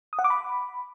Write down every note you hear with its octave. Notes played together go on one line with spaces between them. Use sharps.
D#6
F#5
D6
B5